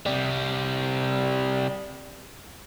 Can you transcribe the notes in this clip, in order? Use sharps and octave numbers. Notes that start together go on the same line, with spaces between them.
C3 G3